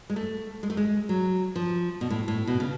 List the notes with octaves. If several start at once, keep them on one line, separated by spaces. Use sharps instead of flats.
G#3
A3
G#3
A3
G#3
F#3
F3
B2
A2
A2
B2
C#3